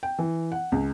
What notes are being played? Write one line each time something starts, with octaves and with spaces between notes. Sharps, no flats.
G5
E3
F#5
C#2